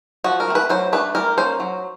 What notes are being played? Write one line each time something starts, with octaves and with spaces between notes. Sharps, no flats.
F3 F#4
A#4
A3 C4
B4
F#3 C5
A3 D4 B4
G3 A#4
A#3 C#4 C5
F#3